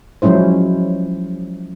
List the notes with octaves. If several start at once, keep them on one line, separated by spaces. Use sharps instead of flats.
F3 F#3 G#3 C#4 E4 C5